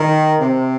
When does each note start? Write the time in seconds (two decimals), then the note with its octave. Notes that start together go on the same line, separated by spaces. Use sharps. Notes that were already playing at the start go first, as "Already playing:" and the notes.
Already playing: D#3
0.40 C3